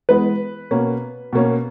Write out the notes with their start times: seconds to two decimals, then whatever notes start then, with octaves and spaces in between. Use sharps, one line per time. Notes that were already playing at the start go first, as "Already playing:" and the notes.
0.09 E3 G#3 B3 B4
0.71 B2 A#3 C#4
1.33 B2 A#3 C#4